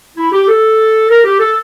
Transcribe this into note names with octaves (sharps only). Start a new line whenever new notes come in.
E4
G4
A4
A#4
G4
A4